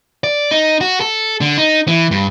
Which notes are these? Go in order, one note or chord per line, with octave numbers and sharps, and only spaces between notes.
D5
D#4
F#4
A4
D3
D#4
E3
G2